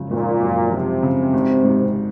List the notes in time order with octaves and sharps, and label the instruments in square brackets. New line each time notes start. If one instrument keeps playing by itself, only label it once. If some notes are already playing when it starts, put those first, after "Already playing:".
Already playing: [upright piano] G#1 F#2 C#3 F3
[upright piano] G#1 [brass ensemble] A#2
[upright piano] F#2
[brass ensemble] C3 [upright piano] F3
[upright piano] C#3
G#1
G#2